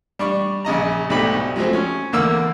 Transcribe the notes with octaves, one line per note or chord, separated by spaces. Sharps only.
G3 D4 C#6
A#1 C#3 D#5 A#5
B1 G#2 A3 D4 G4 B5
F3 F#3 G#3 A3 C4
C#4
E2 D3 A#3 E6